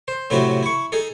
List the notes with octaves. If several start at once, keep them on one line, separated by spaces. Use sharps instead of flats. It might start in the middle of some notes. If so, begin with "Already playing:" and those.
C5
A2 C3 F#3 C4 E4 F#4
E4 C#6
D#4 G#4 A4